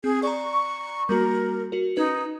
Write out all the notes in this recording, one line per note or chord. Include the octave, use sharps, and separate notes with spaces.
C4 G#4
D5 A#5 C#6
G3 A#3 F#4 A#4
F#4 A#4
C#4 D#4 B4